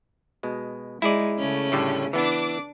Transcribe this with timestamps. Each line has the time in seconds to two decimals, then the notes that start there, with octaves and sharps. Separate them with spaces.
0.43 B2 G#3
1.02 G#3 D#4 E4 G#4 D5
1.38 C#3 A3 C#4
1.72 A2 D3 G3
2.13 E3 B3 D4 E4 D6